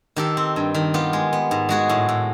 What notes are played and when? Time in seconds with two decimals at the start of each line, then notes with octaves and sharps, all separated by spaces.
0.16 D#3 G4 A4
0.37 C4
0.56 G2
0.74 D#3
0.94 B3 F4 G4
1.13 G#3
1.33 B3
1.51 G#2
1.69 G#3 F#4 G#4
1.89 A2
2.09 A2